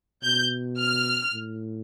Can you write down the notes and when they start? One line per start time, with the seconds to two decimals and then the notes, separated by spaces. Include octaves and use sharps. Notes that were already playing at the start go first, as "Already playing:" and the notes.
0.24 B2 G6
0.78 F6
1.33 A2